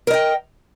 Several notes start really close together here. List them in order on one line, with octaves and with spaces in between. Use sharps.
A#4 D#5 G5